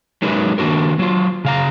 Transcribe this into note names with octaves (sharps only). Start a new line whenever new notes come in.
F#3 G#3 D#4 G4 A#4 B4
D#3 A#3 D4 F#4 A#4
F#3 F4
C#3 F5 A#5